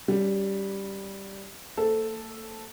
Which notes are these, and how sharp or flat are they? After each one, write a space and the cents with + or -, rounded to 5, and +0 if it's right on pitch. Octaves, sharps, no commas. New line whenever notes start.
G3 +0 C#4 +20 F#4 +0
A#3 -45 A4 +0 C5 +0